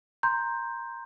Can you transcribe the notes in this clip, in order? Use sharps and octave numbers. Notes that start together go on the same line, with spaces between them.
A#5 C6 G6